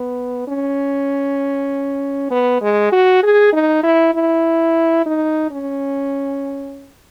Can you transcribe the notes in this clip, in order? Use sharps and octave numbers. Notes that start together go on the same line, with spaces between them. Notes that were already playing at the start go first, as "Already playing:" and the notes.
Already playing: B3
C#4
B3
G#3
F#4
G#4
D#4
E4
E4
D#4
C#4